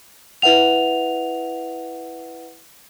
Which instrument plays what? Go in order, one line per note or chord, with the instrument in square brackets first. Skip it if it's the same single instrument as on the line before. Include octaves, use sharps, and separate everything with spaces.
[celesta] E4 B4 E5 F#5 F7